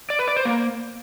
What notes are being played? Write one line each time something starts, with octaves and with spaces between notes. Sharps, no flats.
D5
B4
D5
C5
A#3